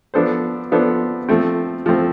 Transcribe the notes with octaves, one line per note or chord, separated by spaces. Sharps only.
F3 B3 D4 A4 C5
F3 B3 D4 A4 C5
F3 A3 C4
F3 A3 C4